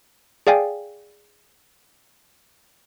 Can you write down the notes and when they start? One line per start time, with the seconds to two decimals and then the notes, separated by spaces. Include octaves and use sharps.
0.47 G#4 D5 F5 G5 G#5